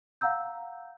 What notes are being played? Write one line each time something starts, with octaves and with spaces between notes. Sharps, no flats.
F5 F#5 A#5 E6 G6